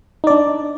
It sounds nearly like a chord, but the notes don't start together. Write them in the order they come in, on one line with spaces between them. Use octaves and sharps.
D#4 D5 D4